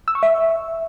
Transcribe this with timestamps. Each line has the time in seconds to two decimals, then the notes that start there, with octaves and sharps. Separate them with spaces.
0.08 E6
0.15 C#6
0.23 E5